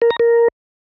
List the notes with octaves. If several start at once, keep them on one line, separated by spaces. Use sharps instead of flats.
A#4
A#5
A#4